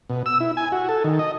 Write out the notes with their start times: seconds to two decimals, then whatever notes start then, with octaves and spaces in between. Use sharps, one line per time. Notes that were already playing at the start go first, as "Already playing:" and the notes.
0.10 B2
0.26 E6
0.40 E4
0.57 G#5
0.72 F#4
0.89 A4
1.04 D#3
1.19 D#5